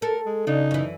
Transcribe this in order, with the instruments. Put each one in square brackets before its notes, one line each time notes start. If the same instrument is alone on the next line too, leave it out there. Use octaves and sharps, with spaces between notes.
[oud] A4 [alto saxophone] A#4
[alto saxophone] G#3
[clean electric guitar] C#3 [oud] D4 [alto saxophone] D#4
[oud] F#2 E3